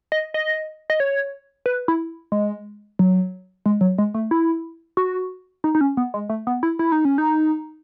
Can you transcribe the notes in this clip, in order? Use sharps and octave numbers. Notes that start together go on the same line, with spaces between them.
D#5
D#5
D#5
C#5
B4
E4
G#3
F#3
G#3
F#3
G#3
A3
E4
F#4
D#4
D#4
C#4
B3
G#3
A3
B3
E4
E4
D#4
C#4
D#4